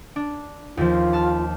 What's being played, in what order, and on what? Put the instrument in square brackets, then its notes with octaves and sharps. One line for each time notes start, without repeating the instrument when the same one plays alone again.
[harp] D4
[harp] D#2 F3 [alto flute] F4
[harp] A5 F6